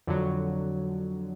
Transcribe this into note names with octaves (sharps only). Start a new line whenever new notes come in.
F2 D3 F#3